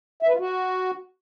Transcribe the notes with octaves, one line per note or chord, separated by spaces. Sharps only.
E5
B4
F4
F#4